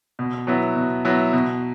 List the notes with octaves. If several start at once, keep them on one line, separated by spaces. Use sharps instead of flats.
B2
F#3 B3 E4
B2
F#3 B3 E4
B2